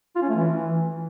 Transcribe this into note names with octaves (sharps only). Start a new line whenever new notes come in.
F4
C#4
A3
E3